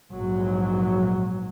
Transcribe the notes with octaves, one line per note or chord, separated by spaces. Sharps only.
A#1 G#2 F#3